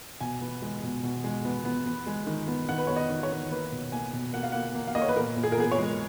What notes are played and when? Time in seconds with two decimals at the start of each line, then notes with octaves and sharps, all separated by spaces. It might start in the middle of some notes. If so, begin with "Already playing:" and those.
0.21 B2 G#5
0.41 B3
0.62 G#3
0.83 B2
1.03 B2
1.24 G#3
1.45 B3
1.65 B3
1.86 B3
2.07 G#3
2.27 D#3
2.48 B3
2.69 D#3 F#5
2.78 B4
2.87 B3 C#5
2.97 D#5
3.10 D#3
3.23 C#5
3.31 D#3
3.51 A#3 B4
3.72 B2
3.92 A#3 G#5
4.13 B2
4.33 A#3 F#5
4.43 F5
4.52 A#3 F#5
4.75 A#3
4.87 F5
4.95 A#3 D#5
5.02 C#5
5.09 B4
5.16 A#2 A#4
5.37 A#2
5.43 G#4
5.52 A#4
5.58 B3 G#4
5.71 C#5
5.78 G#3